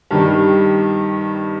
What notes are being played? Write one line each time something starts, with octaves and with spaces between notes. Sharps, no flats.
G2 D#3 G3